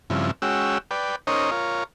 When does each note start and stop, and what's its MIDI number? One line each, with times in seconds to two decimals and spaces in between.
0.10 0.31 43
0.10 0.31 49
0.10 0.31 53
0.10 0.31 60
0.10 0.31 64
0.42 0.78 56
0.42 0.78 61
0.42 0.78 66
0.42 0.78 79
0.42 0.78 88
0.91 1.16 71
0.91 1.16 74
0.91 1.16 79
1.27 1.51 61
1.27 1.51 63
1.27 1.51 70
1.27 1.51 72
1.27 1.51 73
1.27 1.51 75
1.51 1.84 65
1.51 1.84 70
1.51 1.84 73